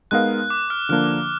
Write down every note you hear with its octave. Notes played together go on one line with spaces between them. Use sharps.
G#3 B3 D#4 A#4 F5 F#6
D6
F6
D3 F3 A#3 D4 F6